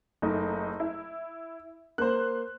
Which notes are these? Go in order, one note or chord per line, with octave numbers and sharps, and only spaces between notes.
F#1 A3 D#4
E4
A#3 C5 F#6